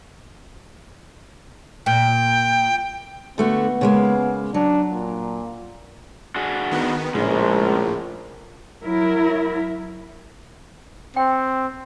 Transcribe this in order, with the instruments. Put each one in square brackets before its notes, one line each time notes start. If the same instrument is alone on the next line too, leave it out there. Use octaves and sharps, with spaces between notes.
[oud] A#2 [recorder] G5
[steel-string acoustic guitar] D3 A3 F#4 [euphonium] B3
[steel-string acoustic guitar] C#3 G#3 A#3
[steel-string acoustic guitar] F#3 [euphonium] D4
[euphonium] A#2
[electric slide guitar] D4 F#4 G#4
[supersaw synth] D#3 B3
[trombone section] A#1 [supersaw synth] A2 [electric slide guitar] C#3 G#3
[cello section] F#3 E4 A#4
[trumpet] C4 [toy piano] G5